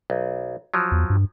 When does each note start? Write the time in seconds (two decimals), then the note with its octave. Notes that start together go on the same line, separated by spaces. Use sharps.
0.10 B1
0.74 F3 F#3
0.92 E2
1.10 G2